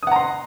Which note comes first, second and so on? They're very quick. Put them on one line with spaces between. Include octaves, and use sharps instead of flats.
D#6 F#5 A#5 C6